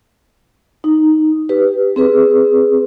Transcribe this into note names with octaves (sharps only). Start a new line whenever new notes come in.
D#4
G4 B4
C4 G#4 B4